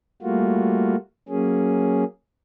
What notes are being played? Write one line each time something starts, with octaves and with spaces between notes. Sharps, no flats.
G3 A3 A#3 F4 F#4
F#3 A#3 C#4 G#4